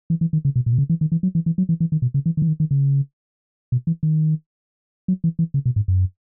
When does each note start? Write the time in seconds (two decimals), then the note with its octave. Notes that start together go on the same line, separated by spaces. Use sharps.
0.10 E3
0.21 E3
0.33 D#3
0.45 C#3
0.56 B2
0.66 A#2
0.73 B2
0.78 C#3
0.90 E3
1.01 D#3
1.12 E3
1.23 F#3
1.35 E3
1.46 E3
1.58 F#3
1.69 E3
1.80 E3
1.92 D#3
2.02 B2
2.14 C#3
2.26 E3
2.37 D#3
2.42 E3
2.48 D#3
2.60 D#3
2.71 C#3
3.72 B2
3.87 E3
4.03 D#3
5.08 F#3
5.24 E3
5.39 E3
5.54 C#3
5.66 B2
5.76 G#2
5.88 F#2